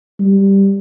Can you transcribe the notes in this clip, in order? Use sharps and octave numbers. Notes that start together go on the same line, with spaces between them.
G3